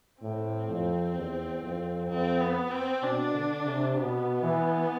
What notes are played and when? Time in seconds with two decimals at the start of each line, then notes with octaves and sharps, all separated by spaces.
0.22 A2 C4
0.69 F2
1.16 E2
1.62 F2
2.09 F2 C4
2.40 B3
2.71 C4
3.02 B2 D4
3.34 D3
3.65 C3
3.96 B2 B3
4.43 E3